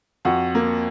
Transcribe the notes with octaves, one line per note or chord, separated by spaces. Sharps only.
F2 F#4
A#3